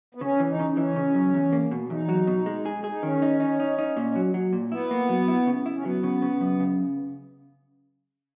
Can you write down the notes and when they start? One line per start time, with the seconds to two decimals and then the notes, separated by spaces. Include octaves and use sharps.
0.15 B3
0.21 C#3 C#4
0.40 E3
0.49 D#4
0.59 C#3
0.70 D#4
0.77 E3 C#4
0.96 C#3
1.15 F#2
1.34 E2
1.53 A#3
1.71 B2
1.90 E2 D#4
2.09 F#3
2.27 B2
2.46 G#3
2.65 G#4
2.84 G#4
2.90 D#4
3.03 D#3 C#4
3.22 D#4
3.40 D#4
3.60 D#4
3.78 D#4
3.97 A#2
4.16 F#3
4.34 F#3
4.53 A#2
4.72 B3 E4
4.91 A#3
5.09 F#3
5.28 E4
5.46 C#3
5.66 E4
5.75 C#4
5.85 F#3 B3
6.03 C#3
6.22 C#3
6.41 F#2
6.60 C#3